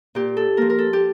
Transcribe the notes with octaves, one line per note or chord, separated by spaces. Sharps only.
A#2 G4
A4
F3 A#3 A#4
A#4
A4
G4